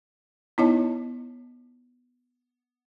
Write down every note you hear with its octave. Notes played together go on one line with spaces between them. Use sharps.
B3 D#4 E4 C#5 D#5 A5